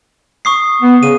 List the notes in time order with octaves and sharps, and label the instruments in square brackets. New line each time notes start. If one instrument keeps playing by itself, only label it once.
[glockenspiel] C#6 D#6 C7
[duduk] B3
[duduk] C#3 [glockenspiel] D#7